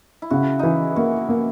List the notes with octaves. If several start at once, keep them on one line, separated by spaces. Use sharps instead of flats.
E4
C#3 F#4
E3 D#4 E4
A#3 F#4
A#3